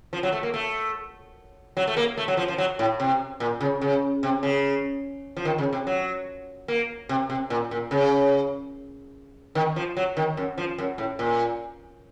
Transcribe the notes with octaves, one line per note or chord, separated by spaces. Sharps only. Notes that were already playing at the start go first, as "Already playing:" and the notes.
F3
F#3
A3
A#3
A3
F#3
A3
A#3
A3
F#3
F3
F3
F#3
A2
C3
A#2
C#3
C#3
C3
C#3
F3
D#3
C#3
C3
F#3
A#3
C3
C3
A#2
A#2
C#3
D#3
F3
F#3
D#3
F#2
F3
F#2
A2
A#2